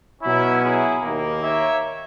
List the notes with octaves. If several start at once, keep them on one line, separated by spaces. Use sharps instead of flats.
B2 F#3 C#4 E4
E4 G#4
D#2 D#3 A#3
C#5 E5